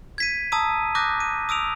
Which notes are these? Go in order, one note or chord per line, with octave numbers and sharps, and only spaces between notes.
G#6 B6 D#7
A5 A#5 D#6 E6 D#7
D6 D#6 F#6 G6 A#6
D#7
D#6 E6 D7 F7